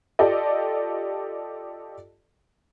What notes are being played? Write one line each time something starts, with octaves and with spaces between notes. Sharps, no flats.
F4 G4 A4 D5 D#5